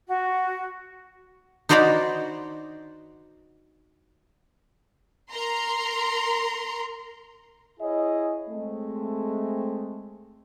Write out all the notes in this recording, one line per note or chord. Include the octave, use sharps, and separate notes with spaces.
F#4
D#4 F#4 C5 D5 A#5 B5
A#4 A#5 C6
E4 G#4 C#5 D#5
G#3 A3 C4